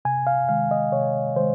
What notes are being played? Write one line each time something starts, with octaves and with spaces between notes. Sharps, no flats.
C3 G#5
F5
D#3 G#3 F5
D#5
C3 C#5
D#3 G#3 C5